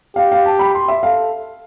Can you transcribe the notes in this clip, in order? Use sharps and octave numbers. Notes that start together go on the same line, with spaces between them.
G4 F5
F5
A5
B5
C6
E5
A4 F5